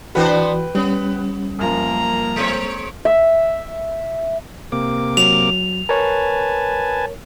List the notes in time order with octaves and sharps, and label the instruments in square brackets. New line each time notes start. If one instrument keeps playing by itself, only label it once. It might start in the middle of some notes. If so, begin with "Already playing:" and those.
[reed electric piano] E3 F#4 [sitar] B3 D4 C5 [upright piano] B4 G5
[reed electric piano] G3 C#4 [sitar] B3
[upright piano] F#2 F3 [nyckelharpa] A#3 A#5
[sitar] G#3 C4 C#5
[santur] E5
[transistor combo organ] C3 A#3 D6
[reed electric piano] F#3 [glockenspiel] F7
[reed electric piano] A#4 C#5 [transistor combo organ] B4 G#5 A5